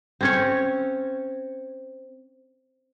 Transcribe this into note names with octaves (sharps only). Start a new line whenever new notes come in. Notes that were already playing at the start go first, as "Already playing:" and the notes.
C4 C#4 C#5